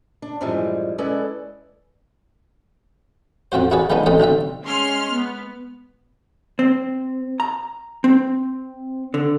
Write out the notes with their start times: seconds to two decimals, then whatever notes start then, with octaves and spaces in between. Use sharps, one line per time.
0.22 D4
0.41 F#2 A2 E3 F3 G3 G#3
0.98 G#3 C#4 E4 A4 B4 D5
3.52 F2 F3 C4 F#4 C5
3.71 E4 F#4 G#4 B4 D5
3.90 D#3 F3 G#3 B3 D4 D#4
4.06 A1 A3 C4 D#5 G5 D#6
4.20 B1 D3 C4 E5
4.63 G#3 C#4 C6 F6
5.12 B3
6.59 C4
7.40 A#5
8.04 C4
9.14 D3